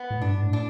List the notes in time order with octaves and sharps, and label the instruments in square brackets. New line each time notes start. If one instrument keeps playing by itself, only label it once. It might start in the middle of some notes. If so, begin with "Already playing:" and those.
Already playing: [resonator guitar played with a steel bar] B3
[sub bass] A2
[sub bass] G2 [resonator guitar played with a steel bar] D4
[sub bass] A2
[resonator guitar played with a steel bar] D4